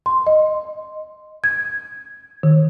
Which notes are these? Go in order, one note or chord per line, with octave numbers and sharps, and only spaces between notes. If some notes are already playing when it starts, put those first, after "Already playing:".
C6
D#5
G#6
D#3